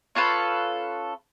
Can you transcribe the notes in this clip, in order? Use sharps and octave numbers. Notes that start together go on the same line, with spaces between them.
C#4 F4 A4 B4